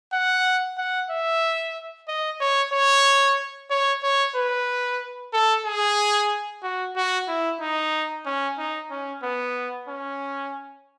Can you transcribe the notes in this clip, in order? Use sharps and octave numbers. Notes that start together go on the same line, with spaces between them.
F#5
F#5
E5
D#5
C#5
C#5
C#5
C#5
B4
A4
G#4
F#4
F#4
E4
D#4
C#4
D#4
C#4
B3
C#4